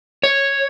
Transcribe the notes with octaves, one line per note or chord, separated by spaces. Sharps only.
C#5